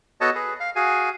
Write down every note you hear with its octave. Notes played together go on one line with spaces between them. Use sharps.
B3 F#4 A4 C#5 D#5 A5
G#4 B4
F5
F#4 G#4 F5 G#5